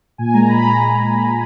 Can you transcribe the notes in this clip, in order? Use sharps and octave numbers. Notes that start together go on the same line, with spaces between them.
A#2 G#5
G#3 A#5
A#2 B5
G#3 A#5